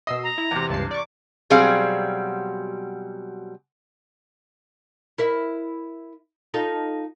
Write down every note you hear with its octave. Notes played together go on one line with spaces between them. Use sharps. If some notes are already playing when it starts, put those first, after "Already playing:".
B2 D#5 E6 C7
A#5
E4
E2 C3
C#2 G2 A5 C7
D5 C#6 D6
B2 F#3 G3 C4 G#4 F5
E4 A#4 E5
D#4 F4 A4